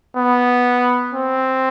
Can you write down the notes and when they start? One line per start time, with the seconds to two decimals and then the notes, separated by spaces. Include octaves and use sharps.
0.17 B3
1.13 C4